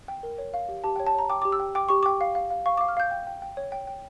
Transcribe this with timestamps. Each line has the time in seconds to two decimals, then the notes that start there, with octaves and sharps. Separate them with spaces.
0.08 G5
0.23 A#4
0.38 C#5
0.54 F5
0.69 G4
0.84 G4 A5
0.96 G5
1.00 C#5
1.07 A5
1.14 C#5 A#5
1.30 G5 D6
1.42 G4 D6
1.52 E6
1.60 G5
1.75 G5 D6
1.89 G4 C#6
2.03 G5 D6
2.21 F5
2.35 F5
2.51 F5
2.66 F5 C#6
2.77 D6
2.81 F5
2.88 F6
2.97 F5 G6
3.11 G5
3.27 G5
3.42 G5
3.57 C#5
3.72 G5
3.87 G5